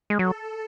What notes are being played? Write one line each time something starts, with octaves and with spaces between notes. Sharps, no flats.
G#3
F#3 A4